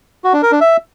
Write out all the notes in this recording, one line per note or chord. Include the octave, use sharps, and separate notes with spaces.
F#4
D4
A#4
D4
E5